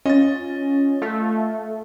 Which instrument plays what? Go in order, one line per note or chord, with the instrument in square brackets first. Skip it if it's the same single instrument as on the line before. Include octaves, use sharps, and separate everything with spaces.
[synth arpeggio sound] C#4 F4 [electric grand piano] D#5 A6
[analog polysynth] A3 [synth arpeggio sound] F4 A4 F5